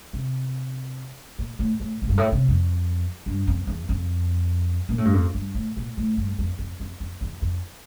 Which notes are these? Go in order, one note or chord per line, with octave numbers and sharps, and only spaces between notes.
C3
A#2
A2
A2
A#2
G2
A2
C3
F2
G2
F2
E2
F2
A#2
A2
G2
F2
G2
A2
A#2
A2
G2
F2
F2
F2
F2
E2
F2